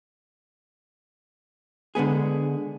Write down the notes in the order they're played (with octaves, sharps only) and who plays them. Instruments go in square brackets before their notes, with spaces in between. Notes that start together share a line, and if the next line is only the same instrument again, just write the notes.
[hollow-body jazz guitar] D3 G#3 B3 G#4